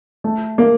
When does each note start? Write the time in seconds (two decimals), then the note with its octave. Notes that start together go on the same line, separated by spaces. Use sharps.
0.24 A3
0.58 A#3